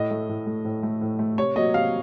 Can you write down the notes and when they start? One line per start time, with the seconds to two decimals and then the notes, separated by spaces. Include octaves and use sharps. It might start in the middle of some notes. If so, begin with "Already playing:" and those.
Already playing: A2 D#5
0.11 A3
0.29 A2
0.46 A3
0.65 A2
0.83 A3
1.01 A2
1.19 A3
1.38 C3 C#5
1.56 F#3 A#3 D#5
1.74 C3 F5